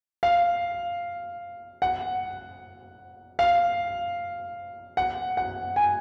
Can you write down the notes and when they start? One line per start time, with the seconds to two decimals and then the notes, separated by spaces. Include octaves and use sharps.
0.23 F5
1.82 F#5
3.39 F5
4.97 F#5
5.37 F#5
5.76 G#5